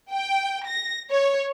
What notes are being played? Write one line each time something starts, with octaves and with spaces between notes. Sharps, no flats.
G5
A#6
C#5